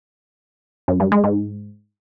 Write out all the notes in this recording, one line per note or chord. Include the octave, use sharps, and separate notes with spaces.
F#2
G2
G#3
G#2